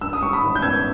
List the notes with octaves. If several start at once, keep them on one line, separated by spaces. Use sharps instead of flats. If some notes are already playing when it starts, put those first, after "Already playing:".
G2 E6
D#6
G3 C#6
B5 D#6
G#1
G6
B3 E6 G#6